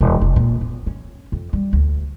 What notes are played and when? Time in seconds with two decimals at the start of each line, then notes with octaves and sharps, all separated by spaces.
0.01 E1
0.21 F1
0.36 A#2
0.61 B3
0.87 C#4
1.32 F2
1.53 G3
1.73 D2